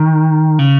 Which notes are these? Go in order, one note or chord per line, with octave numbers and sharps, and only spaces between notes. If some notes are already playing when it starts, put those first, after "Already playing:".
Already playing: D#3
C#3